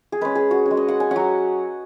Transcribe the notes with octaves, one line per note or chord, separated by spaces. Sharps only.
G#4
G#3 C#4 B4
G#4
F#4
C#4
G#3
D#5
F#5
G#5
F#3 C#4 F#5